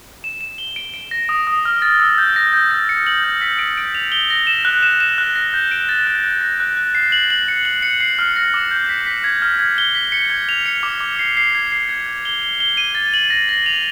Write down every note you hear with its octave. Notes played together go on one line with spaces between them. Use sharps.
E7
E7
G7
D7
D7
A#6
D#6
D#6
F6
A6
E6
G6
A#6
G6
A6
C#7
F#7
G6
B6
D7
D7
F7
G7
A#6
E7
F#6
E7
E7
F#6
A#6
G6
D7
A6
F#6
F#6
A#6
F#6
F#6
C7
F#7
F#7
C#7
F#7
C#7
C7
F6
A#6
D6
G6
B6
B6
G#6
F6
G#6
G7
B6
C#7
G#6
F7
C#7
D6
D6
C7
C7
G#6
C7
G#6
G#6
G7
G7
G7
D#7
A6
F#7
A#6
A#6
F7